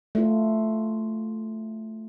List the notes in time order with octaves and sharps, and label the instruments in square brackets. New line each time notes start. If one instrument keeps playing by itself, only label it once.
[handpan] A3 F4